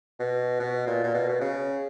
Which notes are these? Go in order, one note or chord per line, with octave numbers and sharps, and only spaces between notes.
B2
B2
A#2
A#2
B2
B2
C#3